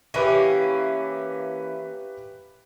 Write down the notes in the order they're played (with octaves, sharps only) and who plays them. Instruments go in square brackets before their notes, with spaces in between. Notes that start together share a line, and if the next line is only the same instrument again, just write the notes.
[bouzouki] E3 A#3 C#4 [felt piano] G4 B4 E5